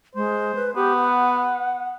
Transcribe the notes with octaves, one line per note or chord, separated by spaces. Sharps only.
G#3 C5
B4
B3 G4
F#5